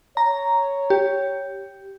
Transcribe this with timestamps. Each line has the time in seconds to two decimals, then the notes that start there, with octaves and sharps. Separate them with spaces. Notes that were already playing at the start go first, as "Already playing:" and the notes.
0.17 C#5 A#5
0.90 G4